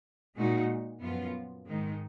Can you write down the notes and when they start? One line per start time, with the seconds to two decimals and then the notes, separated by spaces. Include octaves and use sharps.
0.36 A#2 G#3 D#4 F#4
1.01 F#2 F3 B3 F4
1.66 G#2 D#3 G#3 D#4